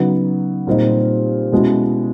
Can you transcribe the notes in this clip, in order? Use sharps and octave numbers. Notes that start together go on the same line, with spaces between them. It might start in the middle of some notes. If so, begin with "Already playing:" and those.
Already playing: C#3 F#3 B3 D#4
A#2 G3 C4 D#4
B2 G#3 C#4 E4